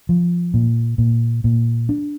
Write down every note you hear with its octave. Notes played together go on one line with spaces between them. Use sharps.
F3
A#2
A#2
A#2
D4